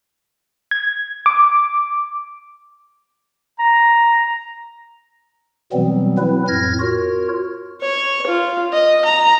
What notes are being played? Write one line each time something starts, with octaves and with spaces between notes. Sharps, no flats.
G#6
D6
A#5
B2 E3 F#3 G3 B3 C4
F#3 C4 E4 B4
F2 A2 F6 G#6 A#6
F4 F#4 A#4 C#5
C#5
F4
D#5
A#5